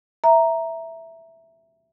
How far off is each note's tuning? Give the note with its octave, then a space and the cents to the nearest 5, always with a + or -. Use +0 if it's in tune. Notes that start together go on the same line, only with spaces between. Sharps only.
E5 +0 A#5 +0